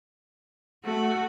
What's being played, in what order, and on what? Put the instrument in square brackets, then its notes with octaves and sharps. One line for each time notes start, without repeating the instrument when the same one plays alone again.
[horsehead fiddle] A3 [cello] F#4